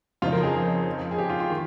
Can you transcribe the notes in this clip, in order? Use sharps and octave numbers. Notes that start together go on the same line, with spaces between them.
F2 C#3 F3 C4 D#4 F4
A#4
G#4
G#4
G4
F4
F4
D#3